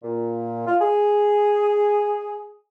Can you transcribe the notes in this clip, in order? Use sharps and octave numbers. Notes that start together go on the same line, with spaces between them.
A#2
F4
G#4